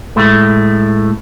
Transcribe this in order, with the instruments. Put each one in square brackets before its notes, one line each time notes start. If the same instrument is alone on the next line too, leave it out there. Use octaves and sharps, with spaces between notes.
[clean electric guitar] A2 G#3 A3